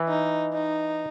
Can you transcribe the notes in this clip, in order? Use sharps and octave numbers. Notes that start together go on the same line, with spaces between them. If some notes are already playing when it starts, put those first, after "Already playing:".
Already playing: E3
D#4
D#4